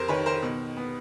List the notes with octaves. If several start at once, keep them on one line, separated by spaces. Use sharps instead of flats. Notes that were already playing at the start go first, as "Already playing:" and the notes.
Already playing: F2 A#4 C5
D#3 B4 C#5
A#4 C5
B2
B3